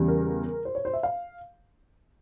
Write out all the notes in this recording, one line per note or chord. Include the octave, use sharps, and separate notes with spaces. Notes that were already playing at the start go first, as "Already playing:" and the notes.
Already playing: E2 C#3 G3
A#4
C5
C#5
C5
E5
F5